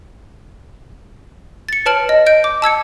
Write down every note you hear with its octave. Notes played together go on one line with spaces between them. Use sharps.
A6 C#7
B4 C#5 A5 F6 D7 F#7
D#5
D#5 G6 D7
D6
A5 E6 G#6 C#7